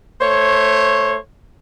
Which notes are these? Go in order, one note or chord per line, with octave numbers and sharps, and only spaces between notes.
A3 C5 C#5